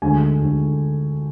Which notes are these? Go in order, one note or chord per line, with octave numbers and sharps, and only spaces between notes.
D2 D3 G#3 G#5
D2 D3 G#3